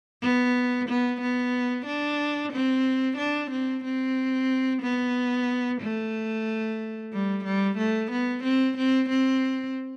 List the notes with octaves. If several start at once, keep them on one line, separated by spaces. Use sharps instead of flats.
B3
B3
B3
D4
C4
D4
C4
C4
B3
A3
G3
G3
A3
B3
C4
C4
C4